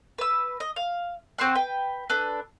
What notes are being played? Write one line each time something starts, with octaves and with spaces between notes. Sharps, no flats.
B4 E6
D#5
F5
C4 F#4 C6 F#6
B4 G5
D4 A4 B4